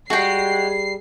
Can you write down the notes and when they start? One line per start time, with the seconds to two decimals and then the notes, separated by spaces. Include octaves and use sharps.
0.10 G3 G#3 F#4 G5 C7